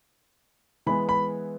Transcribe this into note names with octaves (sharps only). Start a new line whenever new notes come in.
E3 G#3 B3 B5
B5